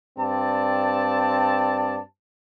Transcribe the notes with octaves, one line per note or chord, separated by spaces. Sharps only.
G2 C4 D5 A5